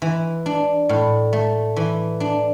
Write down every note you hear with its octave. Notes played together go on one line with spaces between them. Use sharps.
E3
D4
A2
A3
E3
D4